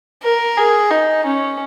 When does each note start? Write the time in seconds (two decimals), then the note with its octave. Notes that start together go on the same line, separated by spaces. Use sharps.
0.24 A#4
0.58 G#4
0.91 D#4
1.25 C#4